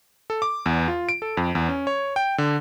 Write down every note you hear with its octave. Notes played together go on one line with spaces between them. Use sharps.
A4
D6
E2
F4
D7
A4
F2
E2
C#4
C#5
G5
D3